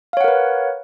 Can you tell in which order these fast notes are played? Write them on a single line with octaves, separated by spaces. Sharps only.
F5 C#5 F#5 A#4 B4